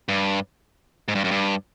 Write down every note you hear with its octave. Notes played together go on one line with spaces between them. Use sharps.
G2
G#2
G2
F#2
G2